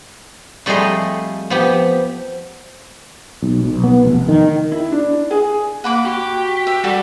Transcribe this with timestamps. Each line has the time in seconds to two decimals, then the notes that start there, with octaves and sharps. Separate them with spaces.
0.66 F2 G3 A3 G#4 D#5 C6
1.50 F3 B3 G4
3.42 B1
3.64 B1
3.84 B3
4.05 F1
4.29 D#3
4.72 E4
4.92 D4
5.31 G#4
5.84 A#3 F#5 B5 D6
6.05 F#4 G4
6.67 E5
6.84 G3 F#4 A4 D5